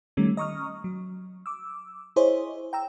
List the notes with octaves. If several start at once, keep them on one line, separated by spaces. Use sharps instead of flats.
D#3 G3 A3 C#4
D#5 A#5 C#6 D#6 F6
F#3
D6 E6
E4 G#4 C5 C#5 D#5
G5 A#5 E6